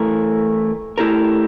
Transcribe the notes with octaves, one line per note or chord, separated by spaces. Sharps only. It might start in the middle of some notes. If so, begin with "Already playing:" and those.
Already playing: E3 A3 E4 A#4
A3 E4 G4 A#4